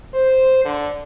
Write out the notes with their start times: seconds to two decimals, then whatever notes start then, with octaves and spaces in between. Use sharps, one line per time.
0.14 C5
0.65 D3